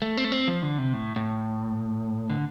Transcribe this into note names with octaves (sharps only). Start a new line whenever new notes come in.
A3
C4
A3
C4
F3
D3
C3
A2
A2
D3